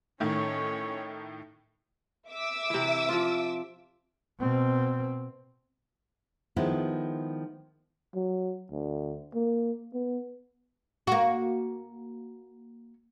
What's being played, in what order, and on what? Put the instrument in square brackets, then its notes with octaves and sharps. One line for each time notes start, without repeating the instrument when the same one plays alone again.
[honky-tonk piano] A2 D#3 A3 [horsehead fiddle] C#4 C#5
[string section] E5 D6 E6
[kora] C3 E3
F3 F4
[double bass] B2 C4
[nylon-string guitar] D#3 F3 G#3 B3 E4
[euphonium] F#3
D2
A#3
B3
[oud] A#3 F#4